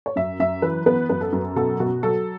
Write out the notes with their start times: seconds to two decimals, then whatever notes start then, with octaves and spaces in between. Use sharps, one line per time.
0.06 C#5
0.16 F#2 E5
0.40 F#2 E5
0.62 E3 B4
0.86 B3 B4
1.09 F#2 B4
1.21 A4
1.33 F#2
1.56 B2 A4
1.80 B2 F#4
2.03 F#3 A4